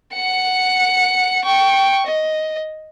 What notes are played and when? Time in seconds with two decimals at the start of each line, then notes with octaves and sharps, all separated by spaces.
0.13 F#5 C#7
1.44 G5 C#6
2.07 D#5